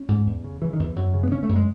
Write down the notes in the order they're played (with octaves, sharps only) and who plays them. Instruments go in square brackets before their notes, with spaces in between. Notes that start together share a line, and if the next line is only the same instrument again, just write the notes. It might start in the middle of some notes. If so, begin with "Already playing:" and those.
Already playing: [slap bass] C#4
G#2
E2
C#3
C#3 E3
D#3
E2 E3
F#2 F#3
C#3
B3
C#3 C#4
A3
F#2
G#3